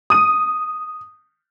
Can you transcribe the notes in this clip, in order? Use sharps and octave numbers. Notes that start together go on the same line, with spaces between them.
D#6 D#7